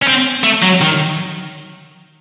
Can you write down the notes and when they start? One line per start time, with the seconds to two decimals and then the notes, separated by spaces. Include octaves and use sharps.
0.02 C#4
0.07 C4
0.44 A3
0.63 F#3
0.81 D#3